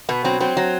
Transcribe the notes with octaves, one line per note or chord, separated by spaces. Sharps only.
B2 B3
F#3 C4
F#3 C4
F#3